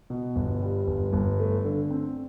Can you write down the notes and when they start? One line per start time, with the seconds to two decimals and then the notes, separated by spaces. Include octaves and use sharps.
0.10 B2
0.36 G1
0.62 G3
0.87 G1
1.13 G1
1.40 A3
1.65 D3
1.91 C4